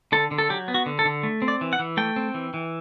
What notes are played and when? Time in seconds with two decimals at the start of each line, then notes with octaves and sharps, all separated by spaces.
0.12 D3 A4
0.31 D3
0.38 A4
0.49 F#3 G4
0.68 B3
0.74 F#4
0.86 D3
0.99 A4
1.05 D3
1.23 A3
1.42 C4
1.48 D5
1.61 E3
1.73 F#5
1.79 E3
1.97 A3 G5
2.16 C4
2.34 E3
2.54 E3